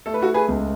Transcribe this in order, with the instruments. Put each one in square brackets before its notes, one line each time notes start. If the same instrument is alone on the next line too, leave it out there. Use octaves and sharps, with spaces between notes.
[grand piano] A3 [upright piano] A4
[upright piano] B4
F#4 A4
G#4 B4
[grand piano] C#2